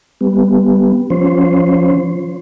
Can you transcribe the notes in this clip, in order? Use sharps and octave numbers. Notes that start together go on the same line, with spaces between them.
G3 B3
F3 C#4 C5